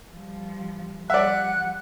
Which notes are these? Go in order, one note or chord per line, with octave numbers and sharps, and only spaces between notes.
F3 G3
F3 G3 D5 E5 F#5 F#6